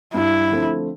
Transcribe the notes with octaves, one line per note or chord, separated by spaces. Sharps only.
G2 E4
D3 F3 A3 C4